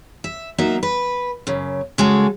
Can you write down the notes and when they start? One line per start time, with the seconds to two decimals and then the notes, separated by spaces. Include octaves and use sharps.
0.24 E5
0.58 F#3 A#3 D#4 E5
0.83 B4
1.47 F#2 C#3
1.98 C#3 G#3 F#4 A4